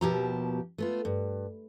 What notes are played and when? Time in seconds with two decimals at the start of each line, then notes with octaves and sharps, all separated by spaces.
0.01 D#2 B2 F3 G4 E5 A#5
0.78 A3 B3 F4
1.05 G2